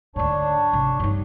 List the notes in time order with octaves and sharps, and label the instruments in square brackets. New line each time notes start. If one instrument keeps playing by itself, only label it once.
[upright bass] D2 G#2 [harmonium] D4 C#5
[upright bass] G#1 C3
G2 D#4